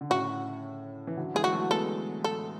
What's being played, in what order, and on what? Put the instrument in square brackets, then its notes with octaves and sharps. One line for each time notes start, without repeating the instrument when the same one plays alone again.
[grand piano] D3
[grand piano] A2 C#3 [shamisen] F#4
[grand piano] E3
D3 F#3
[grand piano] E3 G#3 [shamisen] G#4
[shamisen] F#4
[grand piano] F#3 A3
[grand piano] G#3 B3 [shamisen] A4
[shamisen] A4